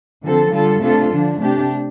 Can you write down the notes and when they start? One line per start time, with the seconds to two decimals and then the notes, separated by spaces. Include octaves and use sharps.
0.24 D3 F3 C4 A4
0.53 D3 G3 F4 A4
0.82 C3 A3 D4 F4 A4
1.12 D3 F3 D4
1.40 C3 A3 D4 G4